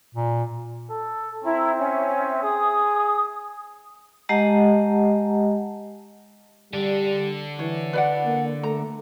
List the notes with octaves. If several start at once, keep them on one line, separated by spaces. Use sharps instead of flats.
A#2
A4
C4 E4 E5 A#5
C#4 E5
G#4 D#6
G#3 G4 D#5 F#5 A5 A#5
D3 G3 D4
E3 C#5
B4 D5 F#5
A#3
A3 A#5